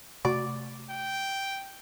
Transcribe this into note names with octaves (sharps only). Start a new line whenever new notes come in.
C3 A3 F#4 D5
G5